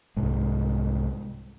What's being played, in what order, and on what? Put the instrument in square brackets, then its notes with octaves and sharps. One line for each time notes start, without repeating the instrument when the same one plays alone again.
[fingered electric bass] C2 G#2